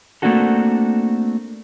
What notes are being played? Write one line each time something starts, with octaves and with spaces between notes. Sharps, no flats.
A3 A#3 C4 D4 F#4 A4